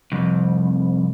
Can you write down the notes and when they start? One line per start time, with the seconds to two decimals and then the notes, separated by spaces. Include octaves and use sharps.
0.12 C2 F2